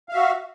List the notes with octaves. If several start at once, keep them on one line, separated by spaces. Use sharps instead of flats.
F#4 E5 F5